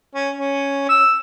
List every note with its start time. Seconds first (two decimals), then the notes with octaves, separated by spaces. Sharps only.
0.15 C#4
0.35 C#4
0.88 E6